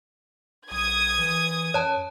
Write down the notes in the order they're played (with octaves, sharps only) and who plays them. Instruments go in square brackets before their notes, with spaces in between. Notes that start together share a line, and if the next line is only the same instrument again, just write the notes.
[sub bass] B1 [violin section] D#6 G#6
[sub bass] E3
[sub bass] F#2 [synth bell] C#5 A5